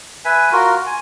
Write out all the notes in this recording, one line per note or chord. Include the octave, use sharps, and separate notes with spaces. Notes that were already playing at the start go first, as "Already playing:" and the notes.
B4 E5 G#5
F4 F#4 A#4
G#5